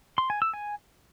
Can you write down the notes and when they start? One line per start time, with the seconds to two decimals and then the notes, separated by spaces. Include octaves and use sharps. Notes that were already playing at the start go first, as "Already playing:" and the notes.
0.18 C6
0.30 G#5
0.42 E6
0.53 G#5